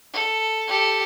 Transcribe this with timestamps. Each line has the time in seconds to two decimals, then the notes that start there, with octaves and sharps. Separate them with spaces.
0.14 A4
0.68 G4 A4